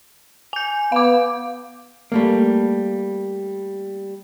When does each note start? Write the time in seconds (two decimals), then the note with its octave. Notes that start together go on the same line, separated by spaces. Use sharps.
0.53 G#5 G6
0.92 B3 F5 D6
2.12 G3 A3 A#3